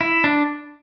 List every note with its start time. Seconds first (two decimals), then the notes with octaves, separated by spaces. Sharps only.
0.01 E4
0.24 D4